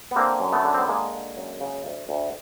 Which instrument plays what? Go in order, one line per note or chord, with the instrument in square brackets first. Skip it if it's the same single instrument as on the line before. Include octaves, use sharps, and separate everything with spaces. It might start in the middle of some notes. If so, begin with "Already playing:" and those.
[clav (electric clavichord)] B3
D3 A#3 C4
F#2
A3 B3
D3
C4
B3
D3 G#3 A#3
D3
F#2
C#3
D2
D2